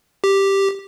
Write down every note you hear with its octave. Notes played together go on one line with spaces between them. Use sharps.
G4